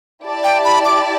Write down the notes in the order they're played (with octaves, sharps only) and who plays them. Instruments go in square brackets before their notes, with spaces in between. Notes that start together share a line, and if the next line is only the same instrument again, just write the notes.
[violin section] E4 G4 D5 A5
[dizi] G5
B5
D6